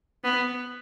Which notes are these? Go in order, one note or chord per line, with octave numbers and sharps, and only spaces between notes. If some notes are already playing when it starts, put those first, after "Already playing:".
B3